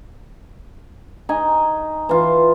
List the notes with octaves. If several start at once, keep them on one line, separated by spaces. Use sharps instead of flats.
D#4 G#5
E3 F4